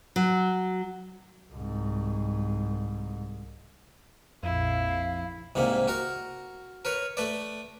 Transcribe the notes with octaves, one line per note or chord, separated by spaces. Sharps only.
F#3
C2 G#2
A#1 F2 E4 F5
C2 G#2 C3 A#3
F#4 A#4 A#5
A#4 B4 C#5
A3 B4 D5